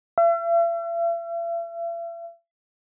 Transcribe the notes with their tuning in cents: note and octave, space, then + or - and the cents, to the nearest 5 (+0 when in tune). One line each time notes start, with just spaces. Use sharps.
E5 +45